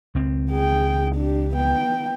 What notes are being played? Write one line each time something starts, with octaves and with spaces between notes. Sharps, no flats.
C#2 C4
G#4 G5
D4 G4
B3 G5